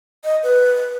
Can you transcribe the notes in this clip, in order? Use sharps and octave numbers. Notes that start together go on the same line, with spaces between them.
D#5
B4